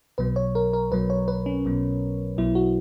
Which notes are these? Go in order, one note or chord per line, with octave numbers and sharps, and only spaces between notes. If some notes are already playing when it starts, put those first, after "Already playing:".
B1 B2 F#3 B4
C#5
A#4
A#4
B1 B2 F#3 B4
C#5
B4
C#4
B1 B2 F#3
B1 B2 F#3 E4
F#4